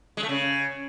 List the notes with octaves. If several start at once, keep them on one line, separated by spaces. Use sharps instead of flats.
G#3
A3
C#3